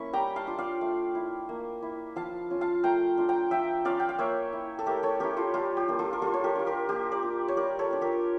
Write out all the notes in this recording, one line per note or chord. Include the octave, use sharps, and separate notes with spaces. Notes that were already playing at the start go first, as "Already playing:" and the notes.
Already playing: A#3 C#4 E4 C#6
G3 G5 A#5
F5 A5
D4 F4
D5 F5
A3
E4
A#3
E4
F3 F5 A5
C#4 F4
F5 A5
A3 G5 A#5
D4 F4
G5 A#5
F3 E5 G5
C#4 F4 D5 F5
G5
F5
A#3 C#5 E5
E4
A4
A3 G4 A#4
A4 C#5
C#4 E4 G4 A#4
F4 A4
G3 F4 A4
G4
A#3 D4 F4
F4 A4
A#4
G3 F4 A4
C#5
G4 A#4
D4 F4
G4 A#4
A#3 G4
A#4 D5
D4 F4
C#5
G3 A#4 D5
A4 C#5
D4 F4
G4 A#4